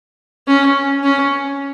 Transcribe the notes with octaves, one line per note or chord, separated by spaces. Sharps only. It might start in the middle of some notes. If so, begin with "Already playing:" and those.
C#4
C#4